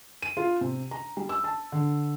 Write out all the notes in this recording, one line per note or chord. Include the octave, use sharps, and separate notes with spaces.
D#7
F4
C3
A#5
G3
E6
A5
D3